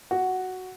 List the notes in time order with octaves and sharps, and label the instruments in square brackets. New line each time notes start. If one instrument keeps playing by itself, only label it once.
[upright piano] F#4